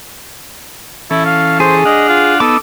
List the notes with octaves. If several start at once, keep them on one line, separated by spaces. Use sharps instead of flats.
E3 C#4 E4 A4
F5
G#4 C5
D4 D#5 F#5 F6
F4
B3 D#4 A4 D6 E6